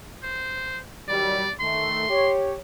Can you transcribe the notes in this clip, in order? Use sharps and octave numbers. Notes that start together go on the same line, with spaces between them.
C5
D#3 F#3 G3 D5
D#3 A3 C6
G4 C#5